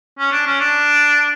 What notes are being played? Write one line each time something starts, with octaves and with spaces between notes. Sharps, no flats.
C#4
D4
C#4
D4